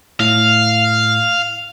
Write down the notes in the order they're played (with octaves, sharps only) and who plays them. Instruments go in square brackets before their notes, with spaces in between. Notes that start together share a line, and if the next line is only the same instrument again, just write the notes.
[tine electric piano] A2 [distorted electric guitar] F5